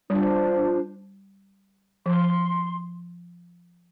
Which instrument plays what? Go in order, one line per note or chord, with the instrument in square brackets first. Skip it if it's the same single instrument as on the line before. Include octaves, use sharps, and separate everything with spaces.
[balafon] G3 [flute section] D4 F4 C5
[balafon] F3 [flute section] C6